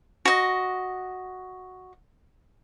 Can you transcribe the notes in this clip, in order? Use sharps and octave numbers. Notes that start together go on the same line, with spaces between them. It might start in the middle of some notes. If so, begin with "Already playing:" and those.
F#4 D#5